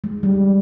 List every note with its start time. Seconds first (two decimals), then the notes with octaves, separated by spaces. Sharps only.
0.04 G#3
0.23 G3